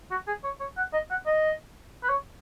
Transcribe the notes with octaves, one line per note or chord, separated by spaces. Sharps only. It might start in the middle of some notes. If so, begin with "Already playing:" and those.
F#4
G#4
C#5
C#5
F#5
D#5
F#5
D#5
B4
C#5